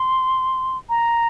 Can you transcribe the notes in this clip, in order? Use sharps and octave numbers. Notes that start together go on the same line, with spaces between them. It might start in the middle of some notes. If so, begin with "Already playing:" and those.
Already playing: C6
A#5